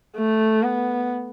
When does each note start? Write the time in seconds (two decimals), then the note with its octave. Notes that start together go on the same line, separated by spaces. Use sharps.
0.17 A3
0.63 B3